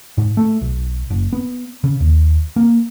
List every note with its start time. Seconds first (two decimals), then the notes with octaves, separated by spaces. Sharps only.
0.18 G#2
0.37 A3
0.61 B1
1.10 F#1
1.33 B3
1.84 C#3
2.00 D#2
2.56 A#3